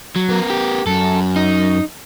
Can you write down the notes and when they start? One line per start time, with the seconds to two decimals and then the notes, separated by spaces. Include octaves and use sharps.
0.16 F#3
0.29 B3 A#4
0.50 G4
0.87 F#2 A4
1.36 D#4